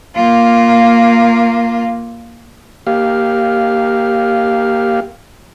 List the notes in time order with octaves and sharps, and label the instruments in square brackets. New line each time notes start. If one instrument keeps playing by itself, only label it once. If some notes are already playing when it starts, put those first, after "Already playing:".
[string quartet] A#3 F4
[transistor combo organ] A#3 G4 F5